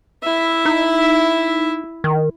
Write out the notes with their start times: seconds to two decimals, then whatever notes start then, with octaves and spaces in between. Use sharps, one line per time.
0.23 E4 E5
0.65 D#4
2.04 D#3